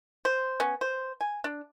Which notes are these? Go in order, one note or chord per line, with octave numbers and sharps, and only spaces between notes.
C5
B3 C#4
C5
G#5
D4